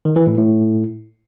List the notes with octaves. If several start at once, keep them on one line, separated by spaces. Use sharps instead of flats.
D#3
E3
A2
A2